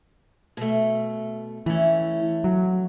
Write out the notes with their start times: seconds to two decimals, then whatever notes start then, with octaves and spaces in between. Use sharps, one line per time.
0.57 B2 A3
1.66 E3 A3 C#4
2.44 F#3